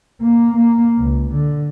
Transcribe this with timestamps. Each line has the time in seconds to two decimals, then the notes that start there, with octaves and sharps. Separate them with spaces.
0.22 A#3
0.56 A#3
0.98 C#2
1.32 D3